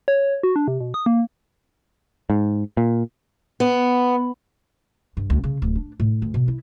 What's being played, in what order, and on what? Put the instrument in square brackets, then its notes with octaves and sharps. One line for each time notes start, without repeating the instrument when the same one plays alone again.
[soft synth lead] C#5
F#4
D4
C3
B2
D#6
A#3
[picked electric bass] G#2
A#2
[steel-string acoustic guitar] B3
[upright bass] G2
D2
C#3
D1
D4
A2
D2
B2
E4